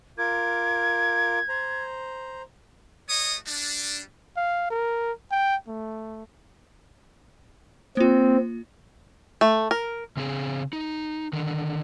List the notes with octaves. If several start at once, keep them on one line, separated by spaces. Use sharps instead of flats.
F4 A#4 D6 G#6
C5 A#5
A3 F#4 C#5 D#5 D#6
G3 D4
F5
A#4
G5
A3
A#3 C4 F4
A3
A#4
C#3 C4 G#4
D#4
D3 D#3